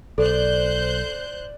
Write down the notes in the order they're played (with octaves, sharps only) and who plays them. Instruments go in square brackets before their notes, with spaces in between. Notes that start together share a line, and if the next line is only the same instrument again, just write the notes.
[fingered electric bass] B1 [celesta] A4 [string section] C5 F#6 G6 [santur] D5